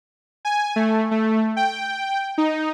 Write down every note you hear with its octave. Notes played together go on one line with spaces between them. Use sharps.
G#5
A3
A3
G5
D#4